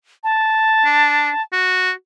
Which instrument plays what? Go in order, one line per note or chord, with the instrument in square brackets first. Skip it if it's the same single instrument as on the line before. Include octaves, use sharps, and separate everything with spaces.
[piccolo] A5
[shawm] D4
F#4